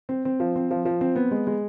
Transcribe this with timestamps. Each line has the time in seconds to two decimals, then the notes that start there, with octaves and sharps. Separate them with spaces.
0.09 C4
0.25 C4
0.40 F3
0.56 C4
0.71 F3
0.85 F3
1.01 C4
1.16 B3
1.31 G#3
1.47 G#3